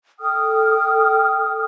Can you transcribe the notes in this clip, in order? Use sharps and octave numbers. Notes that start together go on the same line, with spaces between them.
A4 G5 D#6 F6